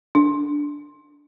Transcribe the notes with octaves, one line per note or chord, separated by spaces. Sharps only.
D4